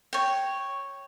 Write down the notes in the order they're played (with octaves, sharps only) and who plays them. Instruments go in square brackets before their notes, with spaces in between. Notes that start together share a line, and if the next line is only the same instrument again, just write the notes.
[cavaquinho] C#5 G5